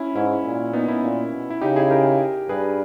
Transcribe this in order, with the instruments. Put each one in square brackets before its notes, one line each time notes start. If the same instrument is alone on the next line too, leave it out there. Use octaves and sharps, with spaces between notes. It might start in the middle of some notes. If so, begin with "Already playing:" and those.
Already playing: [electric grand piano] C#4 E4
[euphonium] G#2 [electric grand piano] C#4 E4
[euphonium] A#2
[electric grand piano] B3 D#4
C#4 E4
[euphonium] A#2
B2
[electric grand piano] E4
[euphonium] C#3 [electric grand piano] D#4 G4
[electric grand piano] E4 G#4
G4 A#4
[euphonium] G2 [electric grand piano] G#4 B4